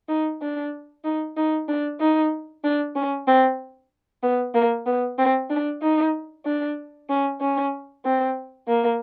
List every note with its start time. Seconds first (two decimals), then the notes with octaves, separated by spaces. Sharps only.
0.08 D#4
0.41 D4
1.05 D#4
1.37 D#4
1.68 D4
2.00 D#4
2.64 D4
2.95 C#4
3.28 C4
4.23 B3
4.54 A#3
4.86 B3
5.18 C4
5.50 D4
5.82 D#4
6.46 D4
7.09 C#4
7.41 C#4
8.05 C4
8.68 A#3